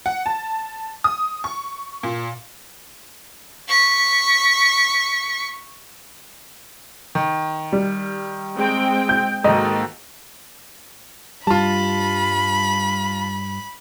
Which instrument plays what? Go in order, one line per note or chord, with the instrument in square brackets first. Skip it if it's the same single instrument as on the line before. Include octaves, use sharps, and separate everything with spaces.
[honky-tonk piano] F#5
A5
D#6
C#6
A#2
[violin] C#6 B6
[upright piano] D#3
[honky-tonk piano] G3
[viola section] G#3 C4 G5
[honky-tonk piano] G6
[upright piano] G#2 D#3 [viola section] A#3 F#4 A4 [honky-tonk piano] D#5
[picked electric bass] G2 G3 [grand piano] F4 A5 [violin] B5